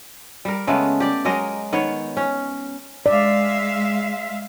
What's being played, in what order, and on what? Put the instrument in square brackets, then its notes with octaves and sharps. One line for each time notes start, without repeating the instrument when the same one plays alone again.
[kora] G3 A#4
C#3 G#3 A3 B3
G4 D5
F#3 G#3 A#4 D#5
D#3 B3 C#5
C#4
[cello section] G#3 E5 F5 [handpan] D5